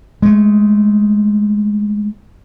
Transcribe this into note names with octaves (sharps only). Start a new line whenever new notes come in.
G#3 A3